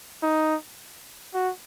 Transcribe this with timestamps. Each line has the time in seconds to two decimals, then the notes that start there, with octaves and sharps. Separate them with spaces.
0.23 D#4
1.34 F#4